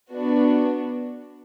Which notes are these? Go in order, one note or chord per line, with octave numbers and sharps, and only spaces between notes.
B3 D4 F#4